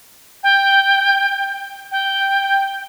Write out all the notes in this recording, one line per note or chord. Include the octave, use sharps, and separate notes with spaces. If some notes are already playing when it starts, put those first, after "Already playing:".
G5
G5